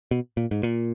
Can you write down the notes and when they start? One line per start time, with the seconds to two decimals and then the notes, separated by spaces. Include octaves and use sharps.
0.11 B2
0.37 A#2
0.51 G#2
0.63 A#2